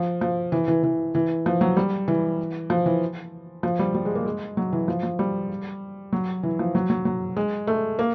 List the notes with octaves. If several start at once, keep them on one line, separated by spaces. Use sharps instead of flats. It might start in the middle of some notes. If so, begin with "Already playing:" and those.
Already playing: F3
F3
E3
E3
E3
E3
F3
F#3
G3
E3
F3
E3
F3
G3
G3
G#3
A#3
G#3
F#3
E3
F3
F3
G3
F#3
E3
F3
F#3
F#3
F#3
G#3
A3
A#3